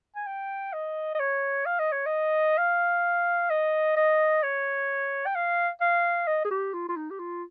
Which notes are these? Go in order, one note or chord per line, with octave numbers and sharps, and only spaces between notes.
G#5
G5
D#5
D#5
C#5
F5
D#5
C#5
D#5
F5
D#5
D#5
C#5
G5
F5
F5
D#5
G#4
G4
F4
F4
D#4
G4
F4